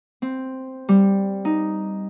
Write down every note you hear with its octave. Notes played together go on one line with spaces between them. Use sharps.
C4
G3
D#4